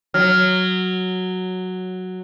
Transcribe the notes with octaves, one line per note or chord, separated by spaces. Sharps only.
F#3 F6